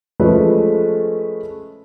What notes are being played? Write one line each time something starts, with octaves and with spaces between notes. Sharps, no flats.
F3 G#3 A3 C#4 A4 B4